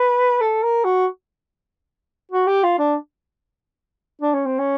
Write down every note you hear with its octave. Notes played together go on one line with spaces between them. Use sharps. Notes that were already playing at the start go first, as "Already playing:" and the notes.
Already playing: B4
A4
A#4
F#4
F#4
G4
F4
D4
D4
C#4
C4
C#4